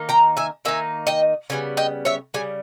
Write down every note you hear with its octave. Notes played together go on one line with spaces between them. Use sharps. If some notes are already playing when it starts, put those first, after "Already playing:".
Already playing: D#3 A#3 D#4
G5 A#5
E5 G#5
D#3 A#3 D#4 E5 G#5
D#5 G5
C#3 G3 B3 G#5
D#5 G5
C#5 E5
C#3 G3 G#5